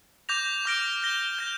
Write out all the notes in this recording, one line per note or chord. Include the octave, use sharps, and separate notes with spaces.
D6 G6 A#6 F7
D6 F6 A#6 D7
G6 A#6 G7
G6 A#6 G7